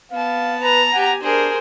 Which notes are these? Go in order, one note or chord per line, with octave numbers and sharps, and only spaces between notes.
B3 F5 A5
B4 A#5
G4 F#5 G#5
D4 G#4 A#4 C5